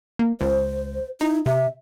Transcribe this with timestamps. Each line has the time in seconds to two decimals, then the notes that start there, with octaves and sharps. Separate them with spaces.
0.19 A#3
0.41 C#2 C5
1.21 D#4 E4
1.46 C3 E5